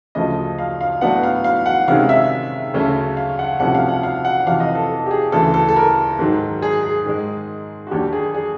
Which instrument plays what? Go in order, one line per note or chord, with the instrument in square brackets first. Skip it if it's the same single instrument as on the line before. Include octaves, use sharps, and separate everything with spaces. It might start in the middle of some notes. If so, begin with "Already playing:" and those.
[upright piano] D2 C#3 F3 A3 D#5
F5
F5
A2 F#3 B3 D4 F#5
F5
F5
F#5
C3 D#3 G#3 C#4 F5
E5
D2 C#3 F#3 A3 C#4
F5
F#5
C2 C3 F3 A3 C#4 F#5
F5
F#5
F5
F#5
F2 C3 E3 F5
D#5
A4
G4
G#4
D2 C#3 E3 A4
A4
A4
A#4
G#2 D#3 F#3
G#4
G#4
G#2 D#3 G#3
F#4
D#2 D3 F#3 G4
G#4
G#4